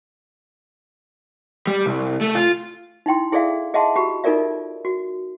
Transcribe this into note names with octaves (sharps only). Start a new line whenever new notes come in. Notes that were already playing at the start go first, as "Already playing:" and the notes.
G3
C2
A3
F4
D#4 E4 G5 C6
E4 G#4 A4 D5 E5 F5
G#4 D#5 E5 F#5 A5 C6
F#4 G4 B5
D#4 F4 A4 A#4 D5 E5
F#4